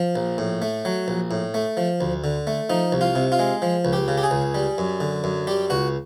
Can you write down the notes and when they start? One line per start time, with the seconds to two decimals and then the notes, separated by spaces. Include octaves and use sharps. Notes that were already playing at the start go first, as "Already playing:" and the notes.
Already playing: F3
0.16 A#1
0.38 A2
0.62 A3
0.85 F#3
1.08 A#1
1.31 A2
1.54 A3
1.77 F3
2.01 D2
2.24 D3
2.47 A3
2.70 F3 D#4
2.92 C2
3.01 F4
3.15 C3
3.32 F4
3.39 G#3
3.62 F3
3.85 C#2
3.93 G4
4.08 C#3
4.18 G4
4.23 G#4
4.31 C#2
4.55 G3
4.78 F#2
5.00 D3
5.24 F#2
5.47 G3 G4
5.70 C#2 F#4